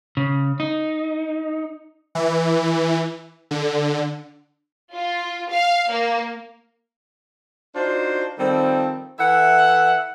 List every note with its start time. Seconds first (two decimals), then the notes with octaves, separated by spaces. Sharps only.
0.17 C#3
0.60 D#4
2.15 E3
3.51 D3
4.93 F4
5.51 F5
5.90 A#3
7.75 D4 D#4 F4 F#4 C5
8.38 D#3 F3 G3 C4 A4
9.19 E3 A4 E5 F#5